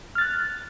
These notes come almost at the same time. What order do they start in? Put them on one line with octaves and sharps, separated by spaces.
F6 A6 F#6